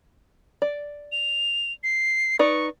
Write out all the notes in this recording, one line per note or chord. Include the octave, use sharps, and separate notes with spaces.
D5
F7
C7
D#4 B4 D5 C#6